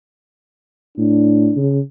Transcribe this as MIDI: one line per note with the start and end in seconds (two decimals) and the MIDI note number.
0.98 1.50 45
0.98 1.59 62
1.56 1.80 49